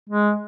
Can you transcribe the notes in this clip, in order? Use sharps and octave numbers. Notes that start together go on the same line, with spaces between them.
G#3